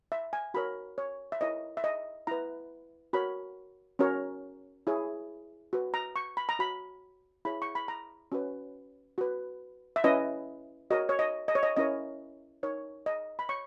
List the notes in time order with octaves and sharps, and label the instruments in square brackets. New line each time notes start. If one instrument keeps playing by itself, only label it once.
[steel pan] E5
G#5
F#4 A#4 C#5 B5
C#5
E5
E4 A#4 C#5 D#5
E5
D#5
E4 B4 A#5
F#4 A#4 C#5 B5
C#4 F#4 A#4 C#5
E4 G#4 C#5
F#4 B4
A#5
C#6
B5
A#5
F#4 C#5 B5
E4 G#4 C#5 B5
C#6
B5
A#5
C#4 F#4 B4
F#4 B4
E5
C#4 E4 B4 D#5
F#4 A#4 C#5 D#5
C#5
D#5
D#5
C#5
D#5
C#4 E4 A#4 C#5 D#5
D#4 A#4 C#5
D#5
B5
C#5 C#6